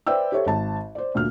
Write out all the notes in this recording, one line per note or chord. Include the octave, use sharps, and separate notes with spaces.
B4 C5 D5 E5 G5 E6
G4 A4 C5 C#5 E5
G#1 A5
C5 D5
D2 A#2 F6